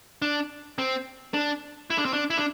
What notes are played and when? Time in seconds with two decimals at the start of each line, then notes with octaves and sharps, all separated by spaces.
0.22 D4
0.78 C4
1.34 D4
1.90 E4
1.98 D4
2.05 C4
2.13 D4
2.30 E4
2.38 D4